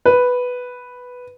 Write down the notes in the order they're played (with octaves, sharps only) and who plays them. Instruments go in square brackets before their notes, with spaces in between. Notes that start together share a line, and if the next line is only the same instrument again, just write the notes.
[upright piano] B4